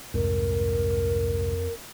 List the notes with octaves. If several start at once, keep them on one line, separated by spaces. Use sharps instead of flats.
C2 F2 G#2 A#4